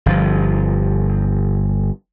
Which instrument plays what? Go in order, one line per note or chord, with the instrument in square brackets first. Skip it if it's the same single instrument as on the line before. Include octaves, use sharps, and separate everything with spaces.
[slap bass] G1 F3